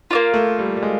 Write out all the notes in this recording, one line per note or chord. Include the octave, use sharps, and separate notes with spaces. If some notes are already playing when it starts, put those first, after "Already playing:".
A#3 D4 F4
A3
G3
G3
G#3